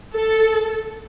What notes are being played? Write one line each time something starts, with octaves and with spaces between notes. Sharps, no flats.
A4